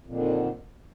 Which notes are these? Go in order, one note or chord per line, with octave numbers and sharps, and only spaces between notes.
F2 A#2 D3 D#3